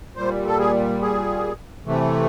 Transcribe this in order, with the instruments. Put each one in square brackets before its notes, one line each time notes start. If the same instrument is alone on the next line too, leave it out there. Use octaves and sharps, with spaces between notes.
[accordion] A#2 G3 C5
A4
G#4
G#4
C3 E3 A3